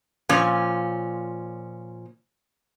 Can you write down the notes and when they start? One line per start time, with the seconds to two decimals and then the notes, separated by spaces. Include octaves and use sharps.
0.29 A#2 F3 C#4